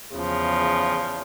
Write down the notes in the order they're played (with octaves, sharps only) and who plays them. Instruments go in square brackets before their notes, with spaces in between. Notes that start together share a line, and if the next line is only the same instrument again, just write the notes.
[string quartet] E2 C#3 F3